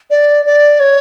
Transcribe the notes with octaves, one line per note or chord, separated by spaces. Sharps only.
D5
D5
C#5